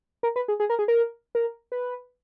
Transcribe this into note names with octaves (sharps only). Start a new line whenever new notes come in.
A#4
B4
G#4
G#4
A#4
G#4
A#4
A#4
B4